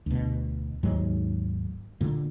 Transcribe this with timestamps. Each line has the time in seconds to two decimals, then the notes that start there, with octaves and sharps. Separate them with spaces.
0.06 D2 B2
0.83 D#2 G#2 F#3 G#3
2.01 A#2 D3 A#3